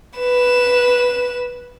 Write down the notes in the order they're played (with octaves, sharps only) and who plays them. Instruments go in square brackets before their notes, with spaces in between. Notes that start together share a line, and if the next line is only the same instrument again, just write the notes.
[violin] B4 E7